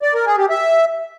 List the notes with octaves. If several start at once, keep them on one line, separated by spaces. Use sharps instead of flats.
D5
A#4
G#4
G4
E5